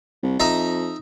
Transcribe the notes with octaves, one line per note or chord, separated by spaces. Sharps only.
C2
F2 D#4 E5 A#5